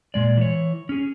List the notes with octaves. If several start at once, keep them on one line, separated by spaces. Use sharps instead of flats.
A#2 G#3 D5
E3 C#5
C#4 G#4